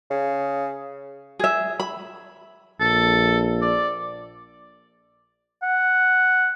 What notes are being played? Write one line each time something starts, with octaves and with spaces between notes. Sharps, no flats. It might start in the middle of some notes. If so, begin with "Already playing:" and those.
C#3
G#4 E5
B5
A#1 A4
D5
F#5